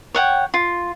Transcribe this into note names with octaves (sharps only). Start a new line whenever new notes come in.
C#5 F#5 G5
F4